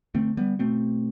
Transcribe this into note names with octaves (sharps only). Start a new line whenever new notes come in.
D3 A3 C4
G3 B3
B2 A3 C4